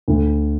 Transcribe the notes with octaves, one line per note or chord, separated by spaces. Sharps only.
D2